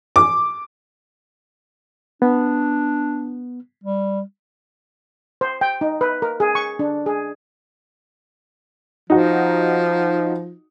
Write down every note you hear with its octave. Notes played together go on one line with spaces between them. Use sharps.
D6
B3 D4
G3
C5
G5
D#4
B4
A#4
G#4
C#6
D4
G#4
F3 D#4 F#4